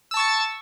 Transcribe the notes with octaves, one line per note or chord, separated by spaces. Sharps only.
A5 C#6 E6 A6